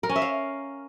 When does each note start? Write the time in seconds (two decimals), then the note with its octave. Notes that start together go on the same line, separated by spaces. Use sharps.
0.03 A#4
0.09 C#4
0.16 E5
0.22 F5